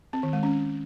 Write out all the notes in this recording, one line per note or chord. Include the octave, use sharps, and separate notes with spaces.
C4
D#3
G#3
C#4